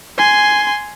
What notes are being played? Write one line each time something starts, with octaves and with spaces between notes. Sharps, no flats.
G#5 C6